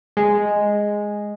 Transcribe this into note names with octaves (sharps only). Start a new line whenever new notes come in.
G#3